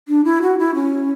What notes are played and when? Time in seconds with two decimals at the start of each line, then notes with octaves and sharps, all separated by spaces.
0.08 D4
0.24 E4
0.42 F#4
0.59 E4
0.75 C#4